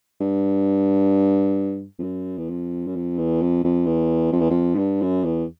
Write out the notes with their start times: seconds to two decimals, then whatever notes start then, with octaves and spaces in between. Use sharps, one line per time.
0.20 G2
1.99 F2
2.03 F#2
2.38 E2
2.49 F2
2.87 F#2
2.96 F2
3.18 E2
3.41 F2
3.64 F2
3.86 E2
4.32 F2
4.41 E2
4.50 F2
4.75 G#2
4.78 G2
5.02 F#2
5.24 E2